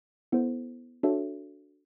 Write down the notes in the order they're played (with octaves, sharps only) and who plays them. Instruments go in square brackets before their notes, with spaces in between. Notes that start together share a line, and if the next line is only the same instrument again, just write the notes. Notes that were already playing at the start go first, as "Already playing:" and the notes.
[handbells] B3 E4 A4 C5
D4 F#4 A4 C#5 E5